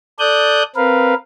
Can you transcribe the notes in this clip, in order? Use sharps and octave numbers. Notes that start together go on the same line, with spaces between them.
A4 D5 D#6 F#6 G6
C4 A#4 B4 F5